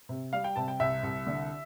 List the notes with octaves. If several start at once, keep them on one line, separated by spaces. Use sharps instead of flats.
C3
G3 F5
G5
C3 A5
G5
C2 E5
C2
D3